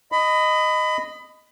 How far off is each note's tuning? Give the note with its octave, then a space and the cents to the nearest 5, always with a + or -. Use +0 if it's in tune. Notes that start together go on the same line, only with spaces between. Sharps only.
D#5 -5 B5 +25